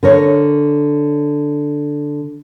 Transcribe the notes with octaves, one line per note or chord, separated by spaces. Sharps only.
D3 A#4 C#5